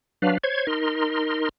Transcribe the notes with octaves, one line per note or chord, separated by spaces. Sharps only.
F#3 D4 B4 F5
C5 C#5 G#6
D#4 A#4 C6